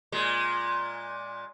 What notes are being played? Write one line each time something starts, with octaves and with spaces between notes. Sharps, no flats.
A#2 G#3